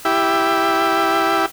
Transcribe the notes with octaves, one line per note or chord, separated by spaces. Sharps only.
E4 G4